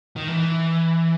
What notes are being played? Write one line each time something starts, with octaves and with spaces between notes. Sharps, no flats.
D#3
E3